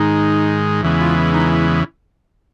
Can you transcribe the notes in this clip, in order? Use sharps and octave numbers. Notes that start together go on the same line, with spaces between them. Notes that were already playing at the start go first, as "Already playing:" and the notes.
Already playing: G#2 D#3 G#3 D#4
E2 C#3 E3 G#3 B3 E4
F4
E4
D#4
E4
E4